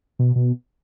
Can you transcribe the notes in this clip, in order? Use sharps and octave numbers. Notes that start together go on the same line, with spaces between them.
B2
B2